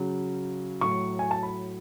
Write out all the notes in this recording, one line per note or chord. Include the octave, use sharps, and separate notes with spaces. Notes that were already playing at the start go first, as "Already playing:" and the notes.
Already playing: C#3 F#3
A2 F#3 C#6
G#5
A5
B5